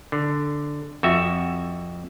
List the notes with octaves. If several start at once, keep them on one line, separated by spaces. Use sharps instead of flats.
D3
F2 F#4 E5